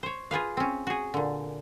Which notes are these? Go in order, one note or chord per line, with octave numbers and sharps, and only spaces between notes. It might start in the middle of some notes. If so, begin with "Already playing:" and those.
C5 C#5
F4 G#4 B4 F5
C4 C#4
F#4 G#4
A#2 D3